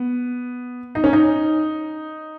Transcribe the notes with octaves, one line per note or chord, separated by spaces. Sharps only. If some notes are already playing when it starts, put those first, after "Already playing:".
Already playing: B3
D#4
C#4
D#4